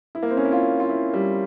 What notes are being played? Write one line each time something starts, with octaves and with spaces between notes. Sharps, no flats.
E4
A#3
C4
C#4
E4
F4
F4
E4
G3